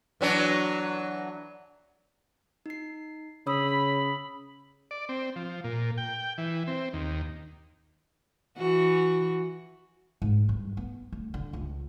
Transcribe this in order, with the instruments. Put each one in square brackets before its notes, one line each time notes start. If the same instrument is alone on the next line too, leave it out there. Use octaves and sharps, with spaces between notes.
[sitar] E3 F#3 D4
[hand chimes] D#4 C7
[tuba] C#3 [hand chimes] C#5 D#6 E6 [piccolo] B5
[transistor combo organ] D5
C4
F3
A#2
G5
E3
C4
D#2
[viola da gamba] E3 F#4
[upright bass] G#2
G2
B3
D2
D3
C#2